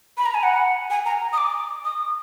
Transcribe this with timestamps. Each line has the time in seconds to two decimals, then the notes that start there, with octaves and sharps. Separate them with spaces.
0.18 B5
0.26 A#5
0.34 G#5
0.43 F#5
0.90 G#5
1.06 A#5
1.33 D#6
1.38 D6
1.85 D#6